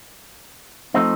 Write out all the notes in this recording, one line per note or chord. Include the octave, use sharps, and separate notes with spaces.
F3 A3 C4 D#4